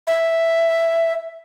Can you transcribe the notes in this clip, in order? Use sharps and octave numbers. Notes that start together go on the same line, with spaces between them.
E5